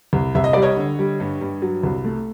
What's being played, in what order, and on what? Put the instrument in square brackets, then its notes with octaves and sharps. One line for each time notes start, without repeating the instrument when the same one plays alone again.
[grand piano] C2
C2 E5
D#5
G3 D5
C#5 D#5
D3
G3
G2
G2
F#3
C2
A3